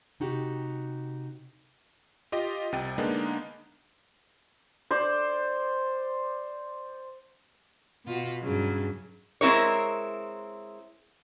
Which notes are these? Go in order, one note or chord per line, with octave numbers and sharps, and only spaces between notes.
C3 D#4 F#4 G4
F4 G4 D#5
C2 C3 G5 A6 D#7
D3 G#3 A#3 B3 D4 D#4
C5 D5
B2 F4 F#4
G2 C#3 F#3
G#3 C4 E4 A#4 C#5